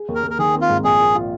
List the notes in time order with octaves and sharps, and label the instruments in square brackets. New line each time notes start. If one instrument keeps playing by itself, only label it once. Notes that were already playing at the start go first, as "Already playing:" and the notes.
Already playing: [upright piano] G#4
D#2
[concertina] A#4
[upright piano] D#2
[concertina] A#4
[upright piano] D#3 [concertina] G#4
[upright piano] C4
[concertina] F4
[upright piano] G#2
[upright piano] A#1 [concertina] G#4
[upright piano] A#2
F4